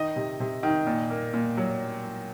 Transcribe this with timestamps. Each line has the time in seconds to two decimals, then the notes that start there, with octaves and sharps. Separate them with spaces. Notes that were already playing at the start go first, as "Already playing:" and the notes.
Already playing: D#3 D#5
0.16 C3
0.40 C3
0.63 D#3
0.87 A#2
1.10 A#3
1.34 A#2
1.57 F#3